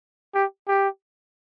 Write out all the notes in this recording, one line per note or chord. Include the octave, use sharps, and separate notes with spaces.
G4
G4